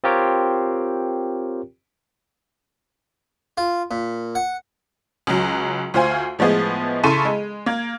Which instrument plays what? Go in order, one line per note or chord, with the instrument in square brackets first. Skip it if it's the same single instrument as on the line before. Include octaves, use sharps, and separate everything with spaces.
[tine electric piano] C4 F4 G4 A#4 C#5 G5
[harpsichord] F4
A#2
F#5
[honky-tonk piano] C#2 F#3
D2 F4 C5 G#5
A2 F3 G#3 B3 G#4
C#3 E4 A4 C6 C#6 D#7
G#3
A#3 G#6